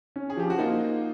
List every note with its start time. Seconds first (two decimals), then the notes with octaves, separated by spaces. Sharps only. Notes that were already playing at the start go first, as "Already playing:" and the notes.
0.16 C#4
0.30 G#4
0.37 F3 G4
0.50 F#4
0.59 A#3 D#4 F4